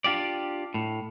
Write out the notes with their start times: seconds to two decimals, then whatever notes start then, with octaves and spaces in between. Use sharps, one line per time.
0.04 D4 F4 G4 D5
0.74 A2